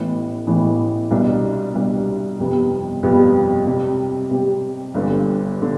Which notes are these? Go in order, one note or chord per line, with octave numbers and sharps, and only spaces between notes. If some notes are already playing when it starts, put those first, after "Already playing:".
Already playing: A1 A2 E3 B3
A1 A2 E3 B3
C2 B2 G3 D4
C2 B2 G3 D4
G1 F2 C3 G3 B3
G1 F2 C3 G3 B3
C3 G3 C4 G4
C3 G3 C4 G4
G1 G2 D3
D3